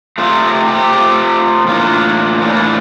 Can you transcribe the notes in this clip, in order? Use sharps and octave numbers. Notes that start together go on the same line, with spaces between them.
C3 F3 A3 F4
G4
G4
C3 F3 A3
A2 E3 A#3 D4 F4
A2 E3 A#3 D4